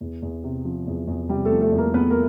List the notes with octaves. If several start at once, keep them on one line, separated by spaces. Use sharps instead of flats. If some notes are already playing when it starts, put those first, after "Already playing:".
E2
E2
C3
F3
E2
E2
C3 G3 G4
A3 A4
F3
A3 A4
E2
A#3 A#4
E2 B3 B4
A#3 A#4